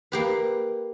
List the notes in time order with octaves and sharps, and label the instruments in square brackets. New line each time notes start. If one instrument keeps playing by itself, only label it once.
[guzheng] A#3 G4 B4